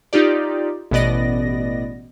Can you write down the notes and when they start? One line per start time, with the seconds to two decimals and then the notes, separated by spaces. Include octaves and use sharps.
0.13 D#4 F4 G4 D5
0.91 A1 B2 B3 D5 D#5 A#6